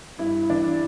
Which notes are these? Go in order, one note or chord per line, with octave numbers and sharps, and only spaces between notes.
G2 E4
E3 D4